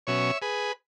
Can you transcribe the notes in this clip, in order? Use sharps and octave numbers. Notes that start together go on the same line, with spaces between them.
B2 F#3 C#4 C#5 E5
G#4 B4